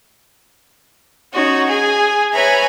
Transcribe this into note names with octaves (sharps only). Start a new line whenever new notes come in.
C#4 D#4 F#4 C#5
G#4 G#5
B4 C#5 E5 G#5 A#5 B5